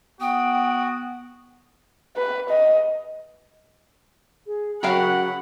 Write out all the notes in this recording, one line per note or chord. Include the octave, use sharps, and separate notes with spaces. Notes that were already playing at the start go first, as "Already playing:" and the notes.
B3 F#4 G5 D#6
B4
D#5
G#4
C#3 F#3 F#4 G4 A#4 F5 F#5 B5